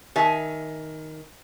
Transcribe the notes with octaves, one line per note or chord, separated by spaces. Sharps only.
D#3 E5 G#5